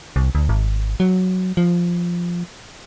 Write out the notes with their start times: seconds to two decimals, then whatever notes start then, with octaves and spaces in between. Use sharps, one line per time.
0.16 C2
0.35 D2
0.49 G#1
1.00 F#3
1.57 F3